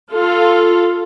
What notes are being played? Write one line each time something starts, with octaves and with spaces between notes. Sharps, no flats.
F4 A4